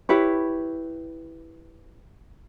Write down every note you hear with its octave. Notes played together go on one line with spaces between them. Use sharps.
E4 G4 B4 C#5